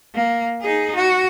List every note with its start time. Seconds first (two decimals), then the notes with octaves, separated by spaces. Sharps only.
0.15 A#3
0.61 D#4 G#4
0.95 F#4